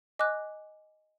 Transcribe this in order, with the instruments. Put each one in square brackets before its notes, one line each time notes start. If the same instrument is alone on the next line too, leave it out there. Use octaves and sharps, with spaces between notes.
[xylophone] D#5 G#5 D6 F#6